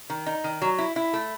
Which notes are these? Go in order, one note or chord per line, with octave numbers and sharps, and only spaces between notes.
D#3
D#4
D#3
F#3
E4
E4
A3